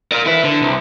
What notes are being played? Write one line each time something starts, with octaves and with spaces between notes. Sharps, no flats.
A#4 D5
E4 B4
D3
C2